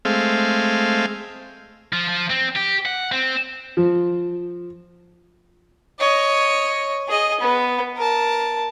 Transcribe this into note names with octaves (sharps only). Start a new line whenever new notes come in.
G#3 A3 C4 F5
F3
F3
C4
G4
F#5
C4
F3
C#5 D#5
G#4 D#5
B3
A#4 A5